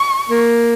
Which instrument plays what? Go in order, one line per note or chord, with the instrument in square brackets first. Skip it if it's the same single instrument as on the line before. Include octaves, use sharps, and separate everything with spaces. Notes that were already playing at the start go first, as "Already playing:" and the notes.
Already playing: [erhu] C#6
[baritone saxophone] A#3